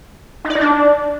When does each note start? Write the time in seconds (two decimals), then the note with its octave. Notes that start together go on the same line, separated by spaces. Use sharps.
0.45 D#4
0.50 D5
0.55 D#4
0.61 D4